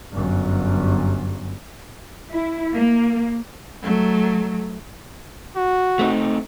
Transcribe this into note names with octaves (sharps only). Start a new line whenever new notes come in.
G1 F#2
E4
A#3
F#3 A3
F#4
A3 C4 D#4